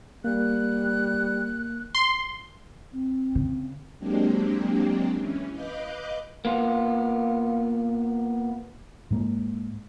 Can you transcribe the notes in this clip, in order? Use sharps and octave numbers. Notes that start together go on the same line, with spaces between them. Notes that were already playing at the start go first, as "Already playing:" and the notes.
G3 A#3 F#6
C6
C4
C#3
F#3 G#3 A#3 C4 D4 G4
E3 C#4
B4 D#5 F5 D6 F#6 G6
A#3 B3 F4
G#2 G#3 A#3